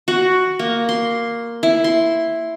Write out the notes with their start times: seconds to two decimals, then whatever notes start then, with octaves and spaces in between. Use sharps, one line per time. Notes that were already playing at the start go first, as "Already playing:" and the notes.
0.08 F#4
0.59 A#3
0.89 C6
1.63 E4
1.84 C6